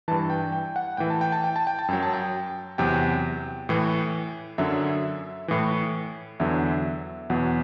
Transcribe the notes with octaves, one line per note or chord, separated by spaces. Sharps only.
G2 E3 A5
G5
G5
F#5
A2 E3 G5
A5
G5
A5
G5
A5
G5
A5
F#2 F#3 G5
A5
G5
E2 C3 F#3 G5
A2 E3
F#2 D3 F#3 E5
A2 E3
E2 D3 F#3 E5
E2 B2 F#3 F#5